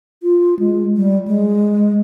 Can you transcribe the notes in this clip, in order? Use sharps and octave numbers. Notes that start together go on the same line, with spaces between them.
F4
G#3
G3
G#3